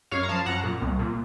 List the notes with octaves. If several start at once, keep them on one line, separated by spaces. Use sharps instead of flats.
F#2 C#5 F5
A#5
F3 F5 A5
F#2 F#5 A#5
A#2
C2
A#2